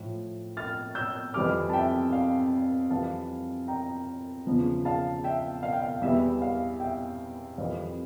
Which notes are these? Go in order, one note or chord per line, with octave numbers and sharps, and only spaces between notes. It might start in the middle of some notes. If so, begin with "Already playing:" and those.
Already playing: A2 F3
F6 A6
E6 G6
F2 E3 G3 D6 F6
A5
E5 G5
F5
F2 E3 G3 F5 A5
G5 A#5
E2 C#3 F3
F5 A5
E5 G5
F5
G5
F5
E2 E3 G3 E5
F5
E5 G5
F2 E3 G3 F5